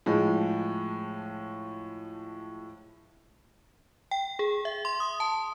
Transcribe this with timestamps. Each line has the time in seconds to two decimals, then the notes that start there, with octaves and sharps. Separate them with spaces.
0.06 A2 F3 G#3
4.11 G5
4.39 G#4
4.65 E5
4.85 C6
5.00 D#6
5.20 A5